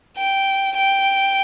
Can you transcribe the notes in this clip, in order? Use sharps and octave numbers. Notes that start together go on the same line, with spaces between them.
G5
G5